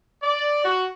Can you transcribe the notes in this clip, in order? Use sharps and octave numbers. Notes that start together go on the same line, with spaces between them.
D5
F#4